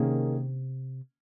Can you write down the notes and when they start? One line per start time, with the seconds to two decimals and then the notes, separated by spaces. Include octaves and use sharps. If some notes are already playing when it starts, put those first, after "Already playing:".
Already playing: C3 D#3 A#3 C#4 G#4